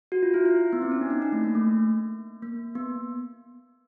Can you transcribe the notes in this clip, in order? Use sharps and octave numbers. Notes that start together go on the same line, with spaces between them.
F#4
F4
E4
E4
B3
C4
C#4
D4
D#4
D4
A3
A#3
A3
A#3
A#3
B3